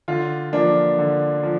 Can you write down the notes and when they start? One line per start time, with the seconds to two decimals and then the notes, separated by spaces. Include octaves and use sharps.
0.08 D3 F4
0.53 F3 A#3 D4
0.98 D3
1.43 F3